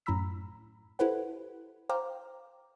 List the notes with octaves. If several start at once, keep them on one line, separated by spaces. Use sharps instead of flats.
F#2 A2 A#5 B5 E6 B6
E4 G4 A4 B4 C5 F#5
C5 F5 G5 A#5 D6 F6